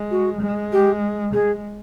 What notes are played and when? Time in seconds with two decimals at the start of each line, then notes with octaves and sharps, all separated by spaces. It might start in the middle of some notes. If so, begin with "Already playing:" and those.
Already playing: G#3
0.11 F#4
0.41 G#3
0.72 G4
1.33 G#3 G#4